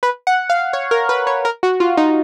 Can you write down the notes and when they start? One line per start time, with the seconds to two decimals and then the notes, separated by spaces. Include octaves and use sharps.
0.03 B4
0.27 F#5
0.50 F5
0.73 C#5
0.91 A#4
1.09 B4
1.27 C#5
1.45 A#4
1.63 F#4
1.80 F4
1.97 D#4